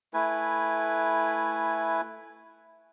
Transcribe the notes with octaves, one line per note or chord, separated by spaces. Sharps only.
A3 E4 B4 G#5